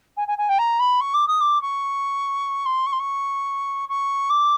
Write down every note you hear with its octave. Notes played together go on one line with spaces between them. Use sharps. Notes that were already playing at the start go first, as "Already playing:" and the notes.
G#5
G#5
G#5
G5
A#5
B5
C#6
D6
D#6
D6
C#6
C6
C#6
C6
C#6
C#6
D6